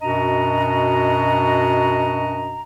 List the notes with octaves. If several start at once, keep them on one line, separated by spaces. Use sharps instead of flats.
F#2 B2 D4 F#4 D#5 A#5